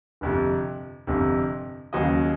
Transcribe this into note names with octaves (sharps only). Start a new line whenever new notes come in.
G1 F2 C3
G1 F2 C3
D#2 C#3 F#3 D#5